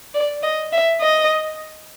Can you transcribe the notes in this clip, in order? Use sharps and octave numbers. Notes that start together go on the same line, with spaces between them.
D5
D#5
E5
D#5